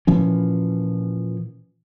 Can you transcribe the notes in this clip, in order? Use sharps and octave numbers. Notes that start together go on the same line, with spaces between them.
A#2 E3 F3 C#4